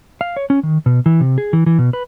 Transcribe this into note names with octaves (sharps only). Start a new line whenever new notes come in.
F5
C#5
C#4
D#3
B2
E3
C3
G#4
E3
E3
B2
B4